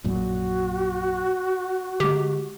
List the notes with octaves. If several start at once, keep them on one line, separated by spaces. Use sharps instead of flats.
A#1 F#2 A#2 F#4
D3 G#3 G4